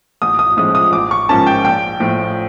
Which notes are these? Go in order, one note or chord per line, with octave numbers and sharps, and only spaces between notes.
A1 D#6
D#6
A2 F3 G#3 C#4 D#6
D#6
A1 D6
C#6
G#2 F3 A#3 C#4 A5
G5
A#1 G5
A2 F3